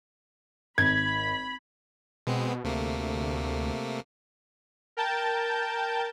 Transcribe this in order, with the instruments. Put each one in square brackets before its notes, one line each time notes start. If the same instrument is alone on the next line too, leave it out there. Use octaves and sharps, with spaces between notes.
[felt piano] G#1 [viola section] B5 [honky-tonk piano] G#6
[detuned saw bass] B2 [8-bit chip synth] G#3 B3 C4
[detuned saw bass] D2 [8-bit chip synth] C3 A3 A#3
[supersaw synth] A#4 G5 A5 G6 A6